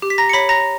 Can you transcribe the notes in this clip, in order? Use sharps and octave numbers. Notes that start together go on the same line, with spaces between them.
G4
B6
A#5 A#6
C#7
C#5 B5 B6
A#5 A#6